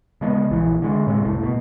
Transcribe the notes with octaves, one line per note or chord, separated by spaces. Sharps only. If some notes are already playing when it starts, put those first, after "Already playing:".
C#3 G#3 A3 B3
A#1 E2 E3
D3 G#3
A2 C3 G3 G#3
F#1 C2 A2
B2